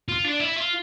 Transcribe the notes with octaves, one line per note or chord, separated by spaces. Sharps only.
F4
D4
E4
F4